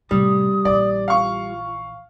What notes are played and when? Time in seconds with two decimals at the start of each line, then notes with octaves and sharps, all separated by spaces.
0.11 A2 C3 G3 D#6
0.65 A#1 E3 D5
1.08 F4 F5 C#6